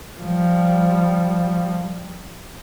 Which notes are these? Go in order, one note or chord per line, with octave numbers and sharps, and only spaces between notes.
F3 G3